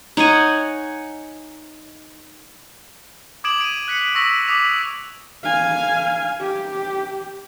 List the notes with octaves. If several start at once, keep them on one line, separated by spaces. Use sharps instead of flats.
D#4 C#5 F#5 G#5
D6 D#6 G#6 D7 E7 F#7
D7 D#7
F#6 B6 C#7
C#6 E6 A#6 B6 F7
D6 D#6 B6 F7
F5 G#5
G4